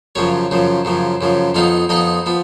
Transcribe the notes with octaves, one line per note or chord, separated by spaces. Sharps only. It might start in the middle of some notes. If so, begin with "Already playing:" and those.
F#2 C#3 F3 C#5
F#2 C#3 F3
F#2 C#3 F3
F#2 C#3 F3
F2 F3 B3 D#4 F5
F2 F3 B3 D#4 D#5
F3 B3